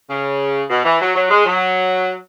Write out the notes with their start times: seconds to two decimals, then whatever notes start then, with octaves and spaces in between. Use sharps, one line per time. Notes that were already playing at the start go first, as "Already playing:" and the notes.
0.09 C#3
0.70 B2
0.85 E3
1.01 F#3
1.16 F#3
1.30 G#3
1.46 F#3